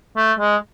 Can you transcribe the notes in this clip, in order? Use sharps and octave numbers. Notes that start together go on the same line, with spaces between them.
A3
G#3